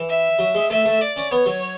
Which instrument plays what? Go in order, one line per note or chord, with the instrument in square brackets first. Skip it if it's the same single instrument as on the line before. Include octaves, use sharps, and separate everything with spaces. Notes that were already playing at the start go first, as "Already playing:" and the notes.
Already playing: [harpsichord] E3
[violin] E5
[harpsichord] F#3
G#3
[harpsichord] A3 [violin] E5
[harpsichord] A3
[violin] D5
[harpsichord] C#4
[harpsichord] B3 [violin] C#5
[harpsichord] F#3